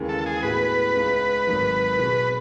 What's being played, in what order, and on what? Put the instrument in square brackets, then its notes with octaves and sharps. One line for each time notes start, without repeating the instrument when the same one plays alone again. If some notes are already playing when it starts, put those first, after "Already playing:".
Already playing: [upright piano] D#2 C#3 E3 G#3 C#4
[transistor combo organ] A4
G#4
[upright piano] A2 G#3 B3 F#4 [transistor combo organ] B4
[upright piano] C#2 C#3 G#3 D#4
G#1 G#2 D#3 F#3
B2 G#3 B3